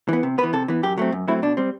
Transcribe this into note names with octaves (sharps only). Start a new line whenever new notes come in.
E3 B3
C3
B3 B4
E3
C3 A4
E3 B3
F#2 G4
F#3 A3 C4
F#2
F#3 A3 C4 E4
B2 D4
G3 C4